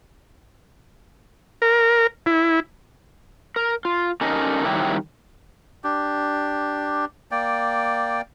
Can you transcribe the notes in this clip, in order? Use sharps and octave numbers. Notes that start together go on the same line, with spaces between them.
A#4
E4
A#4
F4
C#4 D#4 G4 A4 A#4 D#5
D#3 F#3 G3 E4 G4
D4 G4
A#3 D5 G5